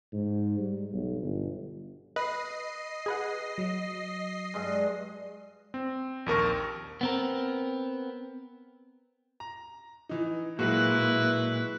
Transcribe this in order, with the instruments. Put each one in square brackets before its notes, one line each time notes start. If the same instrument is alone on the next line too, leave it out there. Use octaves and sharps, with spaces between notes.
[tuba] G#2
G3
B1
G1
[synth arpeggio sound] B4 [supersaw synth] D#5 C7
[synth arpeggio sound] G#4 B4 F#5
[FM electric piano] F#3
[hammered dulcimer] G2 G#3
[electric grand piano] C4
A#1 D#2 A#4 C#6
[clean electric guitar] B3 C4 A#4
[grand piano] A#5
E3 D#4
[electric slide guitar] A#2 [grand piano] F#3 G#3 F#4 [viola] E4 B4